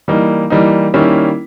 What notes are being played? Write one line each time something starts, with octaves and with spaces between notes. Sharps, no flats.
E3 G3 A#3 D#4
E3 G3 A#3 D#4
D#3 G3 A#3 C#4 E4